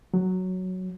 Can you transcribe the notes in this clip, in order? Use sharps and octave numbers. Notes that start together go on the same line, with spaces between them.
F#3